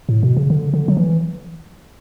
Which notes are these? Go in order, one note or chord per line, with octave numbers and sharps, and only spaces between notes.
A2
B2
C#3
D3
D3
F#3
E3